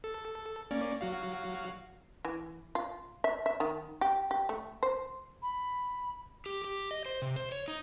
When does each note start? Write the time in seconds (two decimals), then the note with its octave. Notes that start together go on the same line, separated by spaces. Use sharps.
0.04 A4
0.71 A#3 C#4 D5
1.01 F#3 F#4 F5
2.25 E3
2.75 F4
3.24 E5
3.46 E5
3.60 D#3
4.01 G4
4.31 G4
4.49 A3
4.83 C5
5.42 B5
6.46 G4
6.64 G4
6.91 D#5
7.06 C5
7.22 C3
7.36 C5
7.52 C#5
7.68 D#4